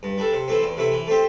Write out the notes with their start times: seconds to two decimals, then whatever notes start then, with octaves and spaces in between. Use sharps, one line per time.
0.03 G2
0.18 G3 D4 A4
0.33 C3
0.48 E3 A3 C4
0.63 E2
0.77 C3 A3 E4
0.92 E3
1.07 A3 C4 G4